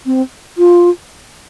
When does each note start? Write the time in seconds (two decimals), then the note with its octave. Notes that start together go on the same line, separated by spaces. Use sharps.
0.06 C4
0.58 F4